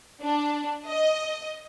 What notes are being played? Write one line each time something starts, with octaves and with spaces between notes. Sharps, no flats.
D4
D#5